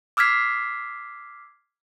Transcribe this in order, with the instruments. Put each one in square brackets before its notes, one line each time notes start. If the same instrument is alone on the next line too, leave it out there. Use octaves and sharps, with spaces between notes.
[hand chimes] D6 E6 F6 G#6 B6 C7